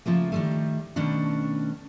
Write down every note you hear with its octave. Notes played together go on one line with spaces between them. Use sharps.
C#3 F3 A3 A#3
D#3 G3 A3
B2 D#3 A3 C#4 D4